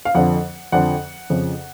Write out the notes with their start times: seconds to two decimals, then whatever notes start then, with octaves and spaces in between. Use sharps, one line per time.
0.05 F5
0.15 F2 D3 F3 F#5
0.72 F2 D3 F3 F#5
1.30 F2 C#3 F3